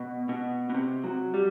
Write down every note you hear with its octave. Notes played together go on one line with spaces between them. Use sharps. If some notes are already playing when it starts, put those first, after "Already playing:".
Already playing: B2
B2
B2
C3
F#3
G3